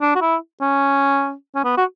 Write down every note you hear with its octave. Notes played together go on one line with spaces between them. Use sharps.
D4
F#4
E4
C#4
C#4
B3
F#4